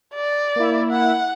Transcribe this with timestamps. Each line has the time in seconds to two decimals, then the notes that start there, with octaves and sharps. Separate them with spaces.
0.14 D5
0.56 A#3 E4
0.91 F#5